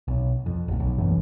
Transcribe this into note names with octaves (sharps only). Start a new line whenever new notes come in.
B1
F2
F1 B1
B1
F1 C#2 F#2 E3